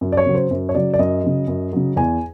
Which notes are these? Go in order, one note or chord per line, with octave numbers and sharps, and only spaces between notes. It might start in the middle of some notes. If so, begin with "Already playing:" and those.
F#2
D5
C#5
C#3 F#3
C5
F#2
C#5
C#3 F#3 D5
D5
F#2 D#5
C#3 F#3
F#2
C#3 F#3
E2 G#5